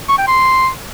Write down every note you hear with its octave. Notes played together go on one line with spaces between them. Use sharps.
C#6
G5
C6